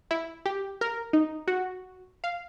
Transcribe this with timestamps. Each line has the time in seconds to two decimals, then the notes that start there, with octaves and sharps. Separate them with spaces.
0.11 E4
0.46 G4
0.81 A#4
1.13 D#4
1.48 F#4
2.24 F5